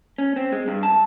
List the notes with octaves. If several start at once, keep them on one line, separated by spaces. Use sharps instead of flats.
C#4
C4
G#3
G2
A5